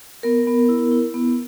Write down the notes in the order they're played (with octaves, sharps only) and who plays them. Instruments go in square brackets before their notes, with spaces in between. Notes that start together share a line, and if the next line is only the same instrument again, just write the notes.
[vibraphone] B3 A#4
B3
E4
E4
B3